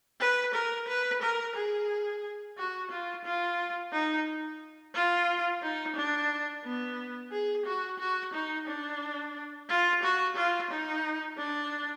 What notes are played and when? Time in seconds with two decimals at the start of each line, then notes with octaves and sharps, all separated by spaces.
0.20 B4
0.54 A#4
0.88 B4
1.22 A#4
1.56 G#4
2.57 F#4
2.91 F4
3.25 F4
3.92 D#4
4.94 F4
5.62 D#4
5.96 D4
6.64 B3
7.31 G#4
7.66 F#4
8.00 F#4
8.34 D#4
8.67 D4
9.69 F4
10.03 F#4
10.36 F4
10.71 D#4
11.38 D4